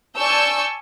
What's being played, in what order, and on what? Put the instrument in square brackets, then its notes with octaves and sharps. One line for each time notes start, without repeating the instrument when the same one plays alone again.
[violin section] D5 G#5 A5 C#6 E6 G6